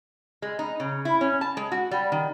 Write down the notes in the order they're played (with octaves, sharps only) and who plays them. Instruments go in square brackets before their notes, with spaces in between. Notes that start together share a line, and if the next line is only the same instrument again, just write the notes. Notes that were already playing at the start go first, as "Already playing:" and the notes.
[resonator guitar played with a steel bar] G#3
D#4
C#3
E4
C#4
A5
G#3
F#4
G3
D#3